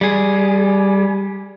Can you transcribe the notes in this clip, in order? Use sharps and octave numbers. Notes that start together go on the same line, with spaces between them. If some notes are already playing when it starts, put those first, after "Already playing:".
G3 G#4